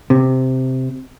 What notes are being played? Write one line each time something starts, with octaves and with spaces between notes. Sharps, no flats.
C3